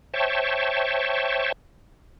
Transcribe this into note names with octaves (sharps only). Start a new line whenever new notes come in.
C5 C#5 E5 G5 A5 C#6